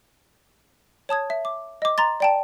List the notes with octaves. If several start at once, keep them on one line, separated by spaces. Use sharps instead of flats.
C#5 A5 D#6 G#6
E5
D6
D#5 D6
A#5 C6 A6
D5 G5 A5